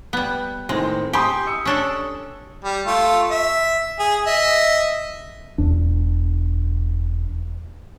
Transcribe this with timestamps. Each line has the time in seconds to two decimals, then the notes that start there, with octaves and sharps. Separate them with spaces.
0.13 G3 B3
0.69 A2 D#3 G#3 C4
1.13 G4 G#5 C6 D#6
1.47 D#6 E6 C#7
1.65 C#4 D4 A4
2.64 G3
2.87 A3 F4
3.31 E5
3.99 G#4
4.26 D#5 E5
5.58 E1 E2 D4